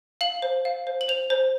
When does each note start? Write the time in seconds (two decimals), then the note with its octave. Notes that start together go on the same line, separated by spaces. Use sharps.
0.21 F5 F#7
0.42 C5
0.65 F5
0.87 C5
1.01 F#7
1.08 C5 F7
1.30 C5